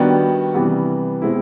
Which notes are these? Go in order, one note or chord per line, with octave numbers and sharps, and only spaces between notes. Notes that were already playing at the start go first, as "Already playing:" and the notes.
Already playing: D#3 G3 B3 D4 F#4
C3 E3 G3 B3
B2 G#3 C4 E4